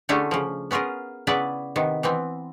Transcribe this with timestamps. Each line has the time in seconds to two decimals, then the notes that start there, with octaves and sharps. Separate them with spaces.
0.09 D3 A3 C#4 E4 G4 G#4
0.31 C#3 F3
0.71 B3 C#4 F4 G#4 A#4
1.27 C#3 B3 E4 B4 D5
1.76 C3 D#3 B3
2.03 E3 B3 C4